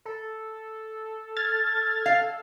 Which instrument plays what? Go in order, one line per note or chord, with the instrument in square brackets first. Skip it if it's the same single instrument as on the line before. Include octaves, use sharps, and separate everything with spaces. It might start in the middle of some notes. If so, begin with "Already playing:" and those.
[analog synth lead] A4
[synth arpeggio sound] F6 G#6 A6
[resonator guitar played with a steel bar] F5